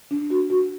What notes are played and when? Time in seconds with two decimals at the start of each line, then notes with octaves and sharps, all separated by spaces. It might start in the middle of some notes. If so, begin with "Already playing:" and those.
0.11 D4
0.30 F#4
0.50 F#4